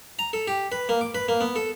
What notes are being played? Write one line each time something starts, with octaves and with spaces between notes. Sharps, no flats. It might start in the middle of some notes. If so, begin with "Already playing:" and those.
A#5
A4
G4
B4
A#3
D6
B4
A#3
B3
A4